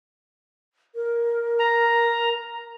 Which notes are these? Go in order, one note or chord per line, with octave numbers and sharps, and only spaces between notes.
A#4
A#5